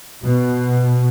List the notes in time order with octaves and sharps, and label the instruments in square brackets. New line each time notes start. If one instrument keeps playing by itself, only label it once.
[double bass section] B2